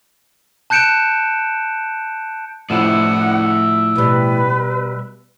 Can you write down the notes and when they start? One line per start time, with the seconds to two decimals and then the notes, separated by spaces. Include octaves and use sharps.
0.70 A5 F#6 G6 C#7 D7 E7
2.70 A2 F3 E4 D5 E5 F#5
3.95 B2 G3 B4